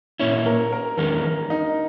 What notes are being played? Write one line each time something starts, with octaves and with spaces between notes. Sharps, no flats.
A#2 A#3 C#4 E4 C#5
A#4
A#4
E2 D#3 G#3 C#4 A#4
A#4
D#4